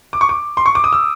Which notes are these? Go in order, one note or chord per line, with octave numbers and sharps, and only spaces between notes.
D6
C#6
D6
C6
C#6
D6
D#6
E6